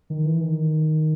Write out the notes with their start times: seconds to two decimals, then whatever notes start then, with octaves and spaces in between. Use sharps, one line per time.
0.10 D#3
0.25 E3
0.41 D#3